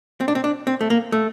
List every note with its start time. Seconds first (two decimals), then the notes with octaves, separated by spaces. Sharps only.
0.21 C4
0.28 D4
0.35 C4
0.44 D4
0.67 C4
0.81 A3
0.90 A#3
1.12 A3